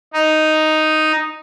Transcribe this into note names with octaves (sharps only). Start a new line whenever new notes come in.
D#4